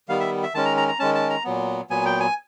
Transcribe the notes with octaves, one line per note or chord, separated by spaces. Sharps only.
D#3 G3 B3 F5
E5
E5
D#3 G#3 C#4 A5
A#5
A#5
A#5
D#3 G#3 C#4 A5
A5
A#5
A#2 F#3 B3
A#2 F#3 B3 G#5
G5
G#5